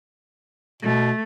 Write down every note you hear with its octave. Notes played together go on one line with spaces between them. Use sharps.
B2 A3